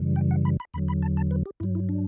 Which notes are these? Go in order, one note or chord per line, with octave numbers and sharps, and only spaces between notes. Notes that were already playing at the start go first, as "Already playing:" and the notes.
Already playing: F#2 C#3 E3 G3
G5
F#5
B5
B5
E2 D3 F#3 B5
B5
A5
A5
B4
G4
G2 F#3 E4
E4
D4